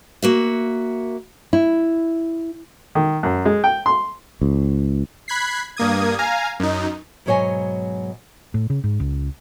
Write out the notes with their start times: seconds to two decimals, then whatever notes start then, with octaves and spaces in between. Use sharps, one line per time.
0.22 A#3 F#4 E5
1.53 E4
2.95 D#3
3.23 F#2
3.45 G#3
3.64 G5
3.86 C6
4.41 C#2
5.28 B5 F#6 G#6 B6 C7
5.76 G2 A#3 D#6 G#6
6.19 F5 G#5 A#5
6.60 F#2 D#4
7.26 G#2 B2 F#3 C#5 D#5 G#5
8.54 A2
8.70 C#3
8.84 G#2
9.00 C#2